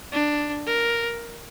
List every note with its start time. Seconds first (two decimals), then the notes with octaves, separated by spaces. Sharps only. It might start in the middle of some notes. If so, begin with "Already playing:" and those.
0.12 D4
0.67 A#4